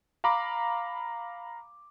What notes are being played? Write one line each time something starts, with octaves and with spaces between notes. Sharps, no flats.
F5 A#5 B5 D6